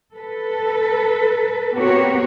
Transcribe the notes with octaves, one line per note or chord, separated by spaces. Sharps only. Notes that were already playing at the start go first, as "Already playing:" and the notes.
A4 B4
B3 C4 F#4 G4 A#4 C#5